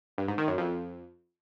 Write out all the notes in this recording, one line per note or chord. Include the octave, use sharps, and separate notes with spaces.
G2
G#2
D#3
F#2
F2